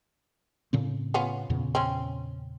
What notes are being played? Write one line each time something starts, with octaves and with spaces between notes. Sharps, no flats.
A2 C#3 C4
B3 C#4 F4
E2 A#2 C#3
C4 C#4